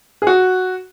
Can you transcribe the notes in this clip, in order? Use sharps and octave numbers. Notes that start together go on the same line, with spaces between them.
G#4
F#4